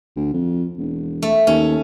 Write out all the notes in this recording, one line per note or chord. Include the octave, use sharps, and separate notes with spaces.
D2
F2
E1
A3
D#2 C#4